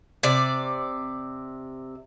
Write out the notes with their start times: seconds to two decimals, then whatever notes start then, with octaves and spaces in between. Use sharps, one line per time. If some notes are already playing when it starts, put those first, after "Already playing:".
0.23 C3 D5